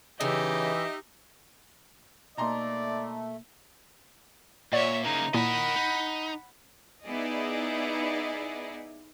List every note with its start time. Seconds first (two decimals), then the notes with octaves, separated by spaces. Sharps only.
0.21 C#3 E3 D#4 G4 D#5 E5
2.37 B2 A3 A#3 D#4 D5 A#5 C6
4.72 A#2 C#5 D5 E5 F#5
5.04 C#3 A#3 D#4
5.34 A#2 A#3 E4 A#4 D#5 F#5 B5
5.76 D#4
7.06 B3 D#4 E4 G#4 D5 D#5